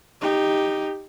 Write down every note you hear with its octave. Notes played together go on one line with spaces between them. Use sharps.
D#4 G4